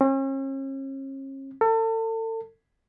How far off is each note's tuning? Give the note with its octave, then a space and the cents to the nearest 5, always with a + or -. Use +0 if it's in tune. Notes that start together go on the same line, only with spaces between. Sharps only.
C#4 -40
A4 +35